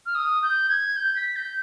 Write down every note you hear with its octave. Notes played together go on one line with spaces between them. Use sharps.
F6
D#6
G6
G#6
G6
B6
G6